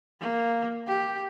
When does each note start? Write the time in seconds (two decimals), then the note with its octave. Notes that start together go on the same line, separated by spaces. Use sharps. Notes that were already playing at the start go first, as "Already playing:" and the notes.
0.21 A#3
0.87 G4